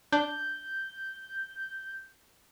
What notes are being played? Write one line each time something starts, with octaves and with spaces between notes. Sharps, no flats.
D4 G6